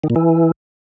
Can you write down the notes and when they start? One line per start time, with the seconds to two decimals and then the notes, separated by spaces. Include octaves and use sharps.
0.04 D#3
0.10 A#2
0.16 E3